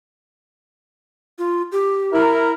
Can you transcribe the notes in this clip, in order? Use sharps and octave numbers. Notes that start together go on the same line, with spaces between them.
F4
G4
E4 A#4